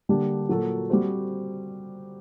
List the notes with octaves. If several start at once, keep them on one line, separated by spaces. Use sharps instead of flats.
D3 G3 A#3 D4 G4
A#2 F#3 A#3 F#4 A4
G3 C4 F#4 C5